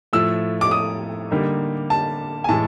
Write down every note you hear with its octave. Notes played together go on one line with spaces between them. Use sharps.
A2 F3 A3 E6
D6
D#6
D3 G3 A#3 D#4
A5
G#5
A2 E3 G#3 A5